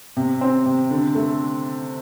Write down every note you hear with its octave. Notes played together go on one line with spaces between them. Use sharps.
C3
C4
C3
D3
A3